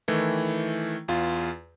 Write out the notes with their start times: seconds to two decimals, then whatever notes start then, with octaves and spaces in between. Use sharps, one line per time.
0.08 D#3 E3 A3 E4
1.08 E2 F4